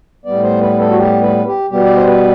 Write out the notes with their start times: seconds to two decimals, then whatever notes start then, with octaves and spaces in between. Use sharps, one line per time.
0.25 A2 G3 B3 D5
0.43 C5
0.61 B4
0.80 A4
0.90 F#4
0.98 G4
1.22 B4
1.47 G4
1.70 B2 G3 B3 G4
1.85 D5
1.96 C5
2.07 B4